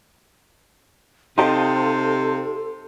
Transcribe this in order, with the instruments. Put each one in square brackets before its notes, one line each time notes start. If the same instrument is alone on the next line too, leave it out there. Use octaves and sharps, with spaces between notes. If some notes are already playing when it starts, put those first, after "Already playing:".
[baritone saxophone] C3 [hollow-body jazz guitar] D#4 G4 [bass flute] A4 [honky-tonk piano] C5 F5 A5